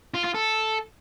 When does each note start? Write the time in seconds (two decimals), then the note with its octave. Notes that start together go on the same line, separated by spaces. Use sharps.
0.14 F4
0.24 F4
0.34 A4